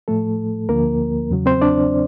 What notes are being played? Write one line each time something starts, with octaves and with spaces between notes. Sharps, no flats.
A2 F3 A3 A4
D2 D3 F3 A#3 A#4
E2 C#3 F#3
C4 C5
D4 D5